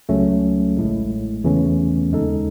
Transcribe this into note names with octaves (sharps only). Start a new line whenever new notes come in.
C#2 C#3 F#3 A3 C#4
A1 A2 G#3
E2 C#3 E3 A3 C#4
D#2 C#3 G#3 D#4 A4